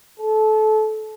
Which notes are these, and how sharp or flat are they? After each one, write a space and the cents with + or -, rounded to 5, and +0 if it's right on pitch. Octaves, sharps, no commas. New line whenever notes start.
A4 -25